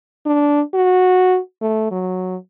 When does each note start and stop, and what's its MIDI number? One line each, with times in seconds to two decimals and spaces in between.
0.26 0.61 62
0.74 1.38 66
1.61 1.89 57
1.91 2.36 54